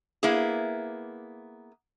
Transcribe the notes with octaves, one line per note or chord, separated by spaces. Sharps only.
A#3 B3 E4 G#4